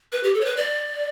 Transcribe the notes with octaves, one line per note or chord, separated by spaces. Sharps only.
B4
G4
A4
C#5
B4
D5